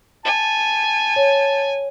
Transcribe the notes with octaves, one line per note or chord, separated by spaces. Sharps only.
G#5 A5
C#5